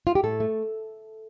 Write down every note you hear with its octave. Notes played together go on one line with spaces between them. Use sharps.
F4
G4
A2 A4
A3